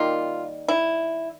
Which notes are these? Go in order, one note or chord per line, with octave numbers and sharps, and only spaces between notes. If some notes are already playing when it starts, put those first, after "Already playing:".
Already playing: D#3 G3 A#3 F4
E4